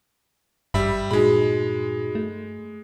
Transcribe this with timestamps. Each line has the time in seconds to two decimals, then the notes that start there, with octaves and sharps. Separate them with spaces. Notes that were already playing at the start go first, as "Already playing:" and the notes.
0.74 G#1 G2 G3 E5 B5
1.11 A#2 G#3 D#4 F#4 G#4 B5
2.15 A3